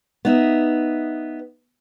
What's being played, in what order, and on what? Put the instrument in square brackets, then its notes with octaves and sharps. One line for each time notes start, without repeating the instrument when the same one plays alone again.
[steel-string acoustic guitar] B3 D#4 E5